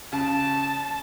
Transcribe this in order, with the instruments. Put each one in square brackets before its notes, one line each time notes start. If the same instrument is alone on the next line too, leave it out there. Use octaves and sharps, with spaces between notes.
[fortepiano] C#3 [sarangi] A5